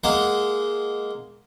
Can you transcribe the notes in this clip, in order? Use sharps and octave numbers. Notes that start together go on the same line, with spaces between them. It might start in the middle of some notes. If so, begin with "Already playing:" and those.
G#3 A#3 F#5